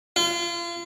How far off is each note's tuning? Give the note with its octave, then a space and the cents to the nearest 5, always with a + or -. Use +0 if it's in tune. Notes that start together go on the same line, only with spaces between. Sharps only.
F4 -35